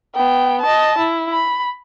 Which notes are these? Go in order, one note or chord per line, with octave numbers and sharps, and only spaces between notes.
B3 G5
D#5 A5
E4
B5